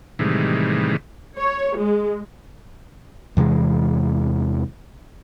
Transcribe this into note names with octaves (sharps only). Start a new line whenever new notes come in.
A2 C3 D#3 E3 G3 G#3
C#5
G#3
E2 C3 E3 G#3